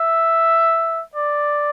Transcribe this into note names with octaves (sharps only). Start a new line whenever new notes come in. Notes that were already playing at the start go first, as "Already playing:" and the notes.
Already playing: E5
D5